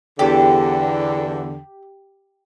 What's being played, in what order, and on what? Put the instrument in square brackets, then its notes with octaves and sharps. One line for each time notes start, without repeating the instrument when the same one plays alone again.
[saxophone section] E2 D3 [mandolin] G4